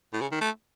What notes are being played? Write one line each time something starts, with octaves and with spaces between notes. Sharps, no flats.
A2
C#3
D#3
A3